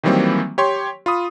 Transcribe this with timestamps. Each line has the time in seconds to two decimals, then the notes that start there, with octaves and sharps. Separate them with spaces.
0.03 D#3 E3 F#3 G3 A#3 C4
0.58 G4 C#5 C6
1.06 F4 B5 D#6